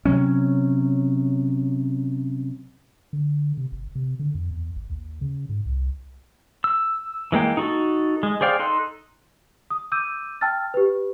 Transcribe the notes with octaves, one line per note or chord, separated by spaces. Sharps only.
C3 F#3 C#4
D3
C3
G1
C3
D3
F2
E2
G#1
D#2
C#3
G#2
C2
E6
E3 G#3 A#3 G5
D#4 F#4 A4
G#3
G#4 C5 D5 F5 G5
D#4 A4 C6 F#6
D#6
D6 E6 G6 D#7
G5 A5 E6 F6 A6
G4 B4